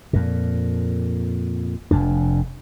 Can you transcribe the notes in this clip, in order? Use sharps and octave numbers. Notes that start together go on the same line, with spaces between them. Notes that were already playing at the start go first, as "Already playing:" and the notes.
F2 A#2
F1 F2 D4